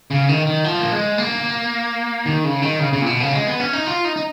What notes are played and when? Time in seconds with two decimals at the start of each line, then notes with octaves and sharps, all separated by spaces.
0.11 C#3
0.29 D#3
0.47 D#3
0.64 F3
0.81 A#3
0.92 G#3
1.18 A#3
2.26 D#3
2.44 C#3
2.62 D#3
2.79 C#3
2.93 C#3
3.01 A#2
3.06 B2
3.20 C#3
3.33 G#3
3.46 B3
3.60 C#4
3.73 D#4
3.87 F4
4.05 D#4
4.16 D#4